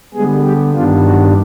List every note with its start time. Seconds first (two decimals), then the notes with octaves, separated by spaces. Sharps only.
0.14 D3 G3 G#3 B3 G#4
0.44 G3 G4
0.74 G2 D#3 G3 B3 D4 F4
1.04 F#3 F#4